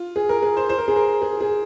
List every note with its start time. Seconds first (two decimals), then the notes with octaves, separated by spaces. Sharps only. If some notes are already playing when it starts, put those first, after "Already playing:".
Already playing: F4
0.16 G#4
0.29 A#4
0.42 G#4
0.57 C5
0.69 C5
0.78 A#4
0.88 G#4
0.96 A#4
1.22 G#4
1.41 G#4